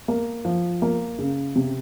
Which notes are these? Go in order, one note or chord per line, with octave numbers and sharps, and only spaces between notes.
A#3
F3
A#3
C#3
C3